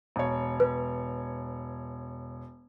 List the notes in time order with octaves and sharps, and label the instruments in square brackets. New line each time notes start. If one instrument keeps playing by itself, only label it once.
[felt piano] E1 C#5
[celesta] B4